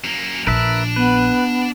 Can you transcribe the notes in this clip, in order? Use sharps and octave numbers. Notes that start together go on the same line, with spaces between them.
F#2 A#3
A#1 D4 A#4 B4 E5 A5
B3 B4